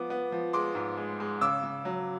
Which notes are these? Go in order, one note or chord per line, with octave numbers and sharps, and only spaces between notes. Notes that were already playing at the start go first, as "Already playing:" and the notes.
Already playing: F3 B3 D6
B3
F3
G#3 C6 D6
G#2
G#3
G#3
C#3 D6 E6
C#3
F#3